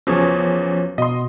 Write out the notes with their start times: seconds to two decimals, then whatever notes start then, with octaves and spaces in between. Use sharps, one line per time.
0.07 E2 C#3 F3 F#3 C#5
0.98 B2 D#5 C6